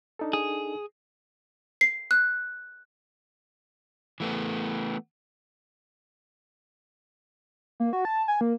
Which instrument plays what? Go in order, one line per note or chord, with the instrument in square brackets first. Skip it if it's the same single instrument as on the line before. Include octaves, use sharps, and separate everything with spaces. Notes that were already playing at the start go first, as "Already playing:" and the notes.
[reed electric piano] D4 D#4 A4
[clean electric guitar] G#4
[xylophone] C7
F#6
[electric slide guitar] E3 A3 B3
[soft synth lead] A#3
F#4
A5
G#5
A#3